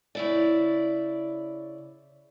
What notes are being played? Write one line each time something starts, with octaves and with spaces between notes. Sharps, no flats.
C#3 E4 D5